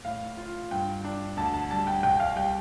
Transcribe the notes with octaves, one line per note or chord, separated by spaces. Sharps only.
A2 F5
F4
G2 G5
D4
D2 A5
A5
G3 A5
G5
C2 G5
F5
G3 G5